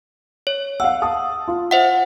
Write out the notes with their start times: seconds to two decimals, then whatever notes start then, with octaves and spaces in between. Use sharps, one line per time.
0.47 C#5
0.80 F5 F#5 E6
1.02 A5 D#6
1.48 F4
1.71 C5 E5 F#5